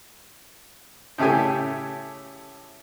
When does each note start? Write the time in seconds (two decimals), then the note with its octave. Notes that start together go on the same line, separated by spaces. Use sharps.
1.18 A2 C#3 A3 G4 G#5